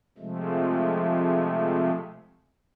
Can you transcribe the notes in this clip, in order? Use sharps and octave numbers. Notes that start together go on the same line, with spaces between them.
C3 F3 G#3 A3